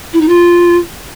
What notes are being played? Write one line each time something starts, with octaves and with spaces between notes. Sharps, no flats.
E4
D#4
F4